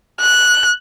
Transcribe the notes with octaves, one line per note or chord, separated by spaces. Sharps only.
F#6